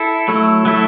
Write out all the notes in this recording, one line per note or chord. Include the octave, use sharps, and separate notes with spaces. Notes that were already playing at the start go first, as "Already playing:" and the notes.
Already playing: E4 A4
F#3 A3 E4 A4
F#3 A3 E4 A4